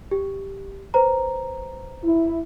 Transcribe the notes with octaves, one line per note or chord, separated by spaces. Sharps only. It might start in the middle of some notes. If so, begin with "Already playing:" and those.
G4
B4 C5 A#5
E4